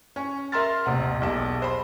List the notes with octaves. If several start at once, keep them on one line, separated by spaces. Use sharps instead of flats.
C#4
A#4 E5 A#5 C6 F6 A6
D#1 A1 C3 F#5
E1 B1 G4 A5
C5 B5